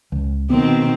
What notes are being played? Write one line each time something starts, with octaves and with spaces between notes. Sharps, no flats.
C#2
B2 D#3 B3 C4